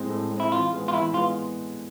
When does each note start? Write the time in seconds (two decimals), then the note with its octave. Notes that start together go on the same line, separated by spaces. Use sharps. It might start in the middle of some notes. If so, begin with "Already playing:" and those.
Already playing: A2 G#3 C4
0.10 A2
0.31 G#3 C4
0.40 E4
0.51 E3 F4
0.72 G#3 B3
0.88 F4
0.94 E3 E4
1.14 G#3 B3 F4